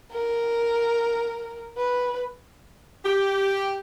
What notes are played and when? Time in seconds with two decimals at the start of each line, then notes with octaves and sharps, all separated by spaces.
0.12 A#4
1.77 B4
3.04 G4